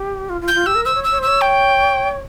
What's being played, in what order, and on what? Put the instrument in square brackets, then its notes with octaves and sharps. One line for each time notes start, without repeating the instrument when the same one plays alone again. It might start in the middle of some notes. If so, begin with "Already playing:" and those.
Already playing: [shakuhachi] G4
F4
F4
[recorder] G6
[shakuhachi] F4
[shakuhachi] G4 [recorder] E6
[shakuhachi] A#4
[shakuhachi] C5 [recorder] E6
[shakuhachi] C#5
[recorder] E6
[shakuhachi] C#5
C5
[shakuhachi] C#5 [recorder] E6
[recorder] G5